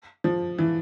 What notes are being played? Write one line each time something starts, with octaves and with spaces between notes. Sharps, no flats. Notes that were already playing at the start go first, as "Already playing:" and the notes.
F3
E3